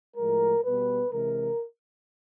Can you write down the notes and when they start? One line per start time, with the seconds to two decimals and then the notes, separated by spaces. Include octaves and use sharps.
0.17 A2 F3 G#3 A#4
0.64 B2 G3 B3 B4
1.11 C3 E3 G#3 A#4